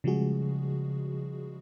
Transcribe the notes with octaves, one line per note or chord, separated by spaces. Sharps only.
C#3 F3 G3 G#3 F#4 G#4